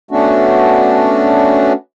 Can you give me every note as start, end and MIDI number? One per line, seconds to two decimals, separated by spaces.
0.11 1.73 57
0.11 1.73 59
0.11 1.73 61
0.11 1.73 62
0.11 1.73 66